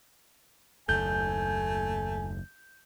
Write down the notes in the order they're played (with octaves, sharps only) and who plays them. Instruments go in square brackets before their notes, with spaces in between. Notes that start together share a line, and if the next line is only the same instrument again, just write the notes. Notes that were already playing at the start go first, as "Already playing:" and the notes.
[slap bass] F#1 D#2 [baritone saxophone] A3 [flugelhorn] G#5 [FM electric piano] G6